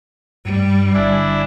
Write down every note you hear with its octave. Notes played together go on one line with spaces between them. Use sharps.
G2 G3
G1 D4 E4 D5 G#5